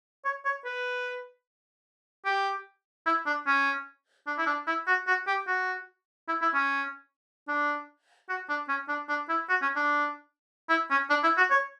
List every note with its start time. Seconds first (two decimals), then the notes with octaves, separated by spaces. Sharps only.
0.25 C#5
0.45 C#5
0.65 B4
2.25 G4
3.06 E4
3.26 D4
3.47 C#4
4.27 D4
4.38 E4
4.46 D4
4.67 E4
4.87 F#4
5.07 F#4
5.27 G4
5.47 F#4
6.28 E4
6.42 E4
6.54 C#4
7.48 D4
8.29 F#4
8.49 D4
8.69 C#4
8.88 D4
9.09 D4
9.29 E4
9.49 F#4
9.62 C#4
9.76 D4
10.69 E4
10.91 C#4
11.10 D4
11.24 E4
11.37 F#4
11.51 C#5